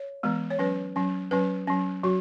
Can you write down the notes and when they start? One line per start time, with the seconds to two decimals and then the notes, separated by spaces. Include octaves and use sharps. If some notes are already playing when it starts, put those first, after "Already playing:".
Already playing: C#5
0.23 E3 G#3 B3
0.50 C#5
0.59 F#3 C#4 B4
0.96 F#3 C#4
1.31 F#3 C#4 B4
1.67 F#3 C#4
2.04 F#3 F#4